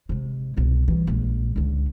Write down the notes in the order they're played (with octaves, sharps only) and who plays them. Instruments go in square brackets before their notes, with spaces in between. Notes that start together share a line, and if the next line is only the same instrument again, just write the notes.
[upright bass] C3 G#3
C2 B2
E3 G3
A#1 G#3
C#2 D3